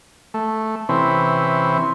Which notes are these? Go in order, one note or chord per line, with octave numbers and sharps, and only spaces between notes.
A3
C3 E3 C4 C#4 B4